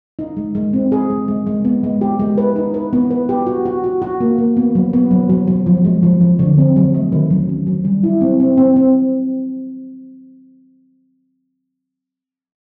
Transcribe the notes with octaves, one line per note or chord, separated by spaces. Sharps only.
D#4
G#3
G#3
C4
G#4
G#3
G#3
G#3
B3
G#3
G4
G#3
B4
D#4
B4
B3
B4
G4
F#4
F#4
F#4
F#4
A#3
A#3
B3
F#3
B3
F#3
F#3
F#3
F3
G#3
F3
F3
D3
C4
F#3
A3
D#3
F#3
C#4
F#3
G3
E4
C4
C4
C4
C4